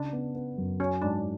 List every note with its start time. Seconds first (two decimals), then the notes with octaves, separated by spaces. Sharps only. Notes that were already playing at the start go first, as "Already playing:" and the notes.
Already playing: C#3 D4
0.13 B3
0.35 B3
0.58 F#2
0.79 C#4 F#4
1.02 G#2 D4